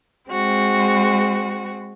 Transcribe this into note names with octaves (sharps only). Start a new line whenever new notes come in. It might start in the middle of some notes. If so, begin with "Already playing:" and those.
G#3 C4 F#4